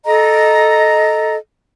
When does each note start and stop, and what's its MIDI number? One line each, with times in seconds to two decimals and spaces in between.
0.05 1.36 69
0.05 1.36 75
0.05 1.36 82